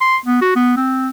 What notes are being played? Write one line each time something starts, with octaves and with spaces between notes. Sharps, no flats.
C6
B3
F#4
B3
C4